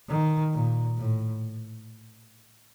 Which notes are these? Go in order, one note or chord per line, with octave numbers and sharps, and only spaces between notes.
D#3
A#2
A2